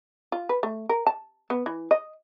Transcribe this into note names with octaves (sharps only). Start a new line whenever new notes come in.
F4
B4
A3
A#4
A5
B3
E3
D#5